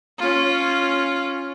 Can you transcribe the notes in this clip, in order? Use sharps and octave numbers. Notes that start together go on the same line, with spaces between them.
C#4 F4